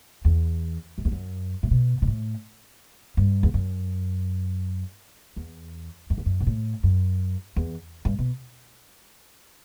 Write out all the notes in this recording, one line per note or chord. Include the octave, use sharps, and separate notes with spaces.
E2
F#2
E2
F#2
A2
B2
B2
A2
G2
E2
F#2
E2
F#2
E2
F#2
B2
A2
F#2
E2
G2
B2